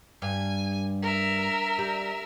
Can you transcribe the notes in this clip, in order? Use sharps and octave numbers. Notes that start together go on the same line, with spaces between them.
G2 G#5
A#4 E5
G3